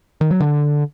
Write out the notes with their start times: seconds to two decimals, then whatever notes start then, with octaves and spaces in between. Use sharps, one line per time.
0.21 D#3
0.31 F#3
0.40 D3